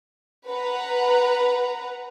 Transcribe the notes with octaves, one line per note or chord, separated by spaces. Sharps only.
B4 F#5 A#5